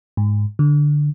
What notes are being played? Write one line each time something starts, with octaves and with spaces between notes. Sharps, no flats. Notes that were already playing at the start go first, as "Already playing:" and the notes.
G#2
D3